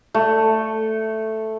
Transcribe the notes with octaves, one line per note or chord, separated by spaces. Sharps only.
A3